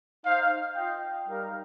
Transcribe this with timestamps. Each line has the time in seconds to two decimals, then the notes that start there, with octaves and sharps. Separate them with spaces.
0.25 D#4 C5 F5
0.76 F4 D#5 G5
1.28 G3 D#4 A#4 F5